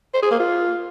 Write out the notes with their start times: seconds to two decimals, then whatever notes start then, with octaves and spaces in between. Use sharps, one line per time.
0.14 C5
0.23 G#4
0.31 A#3
0.40 F4